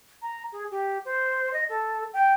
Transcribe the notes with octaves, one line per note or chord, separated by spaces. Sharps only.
A#5
G#4
G4
C5
D#5
A4
G5